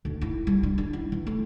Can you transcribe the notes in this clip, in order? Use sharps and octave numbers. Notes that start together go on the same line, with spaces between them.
D2
E4
G3
D4
D4
E4
E3
A3